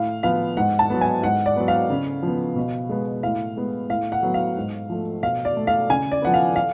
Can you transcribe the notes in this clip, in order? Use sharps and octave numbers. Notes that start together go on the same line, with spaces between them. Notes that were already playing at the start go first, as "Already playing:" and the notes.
Already playing: A2 F5
F3 B3 F5
G#2 F#5
A5
F#3 B3
G#5
G#2 F#5
D5
F#3 B3
F5
C#3
F3
B3
B2
G#3 B3
A2 F5
G#3 B3
A2 F5
F#5
F#3 B3
F5
G#2
F3 A3
B2 F5
D5
A3
F5
C#3 G#5
D5
F3 B3 F#5
F5
F5